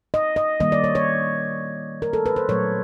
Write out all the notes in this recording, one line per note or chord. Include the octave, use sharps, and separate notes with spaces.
D#5
D#5
D#3 G3 A#3 D#5
D5
C#5
C#5
A#4
A4
B4
C5
A#2 F#3 A3 C#5